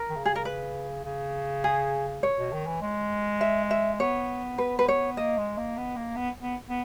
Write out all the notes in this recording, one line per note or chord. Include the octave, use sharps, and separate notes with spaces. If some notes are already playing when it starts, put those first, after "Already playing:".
Already playing: A#4
D#3
C#3
G#4
A#4
B4
C#3
G#4
C#5
B2
D#3
E3
G#3
E5
E5
B3 C#5
B4
B4
C#5
A#3 D#5
G#3
A#3
B3
A#3
B3
B3
B3